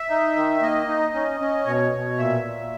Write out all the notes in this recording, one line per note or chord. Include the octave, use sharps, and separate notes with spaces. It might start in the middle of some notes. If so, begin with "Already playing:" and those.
Already playing: E5
D#4
D#3
A#3 D#5
D#4
C#4
C#4
B2 C#5
B2
A#2 E5
A#2